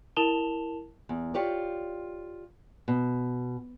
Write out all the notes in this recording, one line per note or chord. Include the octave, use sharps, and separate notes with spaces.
E4 A#4 A5 E7 F7 G7
E2
F4 G4 C#5 D5
B2